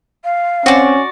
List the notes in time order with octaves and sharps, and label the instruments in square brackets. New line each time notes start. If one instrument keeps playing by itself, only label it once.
[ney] F5
[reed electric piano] C4 [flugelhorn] C#4 [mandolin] F#4 D5